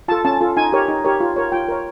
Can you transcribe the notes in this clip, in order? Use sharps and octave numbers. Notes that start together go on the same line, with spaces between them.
F4 A4 A5
C#4 A5
F4 A4
D#4 G#5
G4 A#4 C#5
D#4
G4 A#4 C#5
F4
A#4 C#5
F4 G5
A#4 C#5